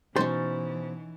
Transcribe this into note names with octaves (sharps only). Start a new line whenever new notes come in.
B2 E3 C#4 D#4 C5 A6